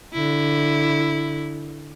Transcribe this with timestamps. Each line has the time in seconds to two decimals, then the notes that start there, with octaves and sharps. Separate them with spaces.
0.14 D3 E4